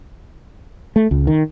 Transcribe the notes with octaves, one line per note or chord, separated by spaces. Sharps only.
A3
C#2
D#3